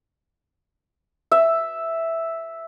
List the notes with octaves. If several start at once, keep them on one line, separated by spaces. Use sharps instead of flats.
E5